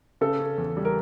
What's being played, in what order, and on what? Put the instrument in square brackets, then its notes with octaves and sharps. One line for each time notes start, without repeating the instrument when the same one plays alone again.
[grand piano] C#3 [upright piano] A4
[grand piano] C#4
E2
G3
[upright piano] A#4